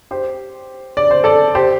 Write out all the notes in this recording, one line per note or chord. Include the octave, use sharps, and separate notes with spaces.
G4 C5
D5
C5
A4 D5
G4 C5